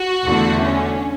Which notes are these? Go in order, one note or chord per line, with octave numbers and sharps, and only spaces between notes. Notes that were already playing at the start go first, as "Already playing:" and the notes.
Already playing: F#4
E2 D3 A3
C#4